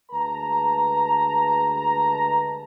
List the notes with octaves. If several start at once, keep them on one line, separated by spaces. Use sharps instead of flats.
D2 G#3 B4 A5 A#5